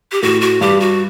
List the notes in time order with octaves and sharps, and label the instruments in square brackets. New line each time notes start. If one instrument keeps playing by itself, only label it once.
[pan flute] G4
[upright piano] A2 [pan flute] F#4
[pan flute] F#4
[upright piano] G2 [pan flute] G4
[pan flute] F#4